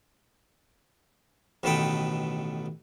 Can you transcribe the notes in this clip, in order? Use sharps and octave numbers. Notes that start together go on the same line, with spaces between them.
A1 B2 D#3 A4 B4 G5